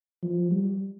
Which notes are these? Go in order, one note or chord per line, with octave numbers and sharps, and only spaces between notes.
F3
G3